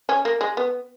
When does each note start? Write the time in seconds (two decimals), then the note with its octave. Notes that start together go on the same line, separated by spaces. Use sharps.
0.09 C#4
0.25 A#3
0.41 G#3
0.57 B3